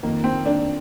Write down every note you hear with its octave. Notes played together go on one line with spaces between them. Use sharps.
F2 D#3 A#3
C4
A#3 D4